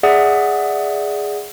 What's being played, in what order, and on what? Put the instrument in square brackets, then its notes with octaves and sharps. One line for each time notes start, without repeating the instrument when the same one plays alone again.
[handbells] G#4 D5 E5 F#5 D#6